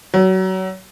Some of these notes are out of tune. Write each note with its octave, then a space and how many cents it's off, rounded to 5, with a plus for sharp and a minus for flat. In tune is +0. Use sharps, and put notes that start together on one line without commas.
F#3 +25